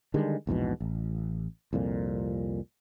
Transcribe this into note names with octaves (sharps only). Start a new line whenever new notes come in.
D3 D#3 G3 G#3
A#1 E2 G#2 B2
A1
C2 F2 A#2